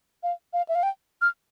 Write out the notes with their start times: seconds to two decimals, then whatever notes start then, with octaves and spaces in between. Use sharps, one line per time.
0.23 F5
0.53 F5
0.69 E5
0.75 F5
0.83 G5
1.22 F6